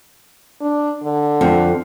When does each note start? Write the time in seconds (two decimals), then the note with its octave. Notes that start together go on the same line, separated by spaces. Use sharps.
0.61 D4
1.03 D3
1.41 F2